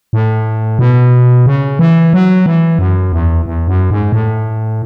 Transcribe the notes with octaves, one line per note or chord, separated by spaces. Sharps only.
A2
B2
C#3
E3
F#3
E3
F#2
E2
E2
F#2
G#2
A2